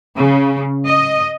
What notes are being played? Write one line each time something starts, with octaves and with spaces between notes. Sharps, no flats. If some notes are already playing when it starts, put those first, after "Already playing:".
C#3
D#5